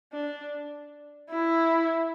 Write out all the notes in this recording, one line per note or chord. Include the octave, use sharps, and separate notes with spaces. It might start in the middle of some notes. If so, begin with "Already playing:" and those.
D4
E4